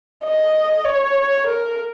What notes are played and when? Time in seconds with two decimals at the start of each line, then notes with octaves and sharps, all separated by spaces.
0.24 D#5
0.85 C#5
1.46 A#4